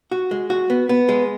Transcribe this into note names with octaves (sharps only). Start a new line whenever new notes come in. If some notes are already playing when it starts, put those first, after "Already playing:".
F#4
G#3
F#4
B3
B3
G#3